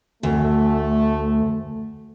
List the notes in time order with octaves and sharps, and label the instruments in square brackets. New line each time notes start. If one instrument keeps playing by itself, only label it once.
[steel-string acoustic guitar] D2 [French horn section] A3